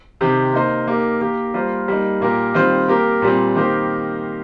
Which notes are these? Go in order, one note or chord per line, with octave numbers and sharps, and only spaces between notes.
C3 D#3 C4 G4
A#3 D#4 C5
A#3 D#4 G4 A#4
A#3 G4 A#4
G3 A#3 F4 C5
G3 A#3 D#4
A#2 A#3 G4 A#4
D#3 G3 C4 F4 C5
A#3 G4 A#4
A#2 G3 C4
D#3 A#3 G4 C5